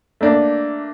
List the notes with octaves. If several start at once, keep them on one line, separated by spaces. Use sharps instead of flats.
A3 A#3 D4